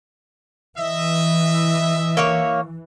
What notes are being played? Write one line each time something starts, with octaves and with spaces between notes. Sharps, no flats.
E3 D#5 E5
A#3 C#5